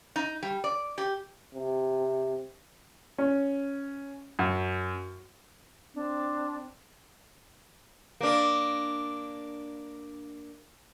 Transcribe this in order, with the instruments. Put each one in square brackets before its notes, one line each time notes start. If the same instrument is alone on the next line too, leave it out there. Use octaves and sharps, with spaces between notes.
[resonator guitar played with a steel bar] D#4
G3
D5
G4
[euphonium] C3
[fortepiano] C#4
F#2
[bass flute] C4 [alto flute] D4
[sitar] A#3 D4